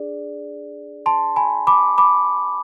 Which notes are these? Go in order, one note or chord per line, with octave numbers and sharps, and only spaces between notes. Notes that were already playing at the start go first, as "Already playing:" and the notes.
Already playing: D4 G#4 D5
A5 C6
G#5 B5
B5 D6
B5 D6